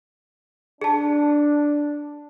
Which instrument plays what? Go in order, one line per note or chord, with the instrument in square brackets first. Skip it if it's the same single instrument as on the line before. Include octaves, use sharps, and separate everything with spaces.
[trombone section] D4 [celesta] G#4 A5